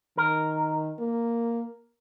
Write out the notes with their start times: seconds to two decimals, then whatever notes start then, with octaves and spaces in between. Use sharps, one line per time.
0.17 D#3 A#4
1.00 A#3